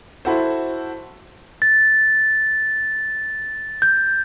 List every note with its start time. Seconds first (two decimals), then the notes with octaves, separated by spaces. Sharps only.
0.25 E4 F#4 A4 C5
1.62 A6
3.82 G6